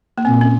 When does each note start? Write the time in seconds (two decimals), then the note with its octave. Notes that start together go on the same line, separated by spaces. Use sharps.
0.18 A#3
0.25 A#2 C4
0.41 C#4